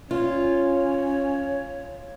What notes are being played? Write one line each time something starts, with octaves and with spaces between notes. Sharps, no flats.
C#4 F4 C#5